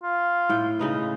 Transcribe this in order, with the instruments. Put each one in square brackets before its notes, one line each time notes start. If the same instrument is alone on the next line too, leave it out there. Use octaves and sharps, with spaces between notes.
[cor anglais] F4
[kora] A2 G5
C#3 D#4 B4